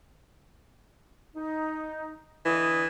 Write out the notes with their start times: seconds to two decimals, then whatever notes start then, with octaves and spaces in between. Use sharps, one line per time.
1.35 D#4
2.45 D3 E3 D#5 D#6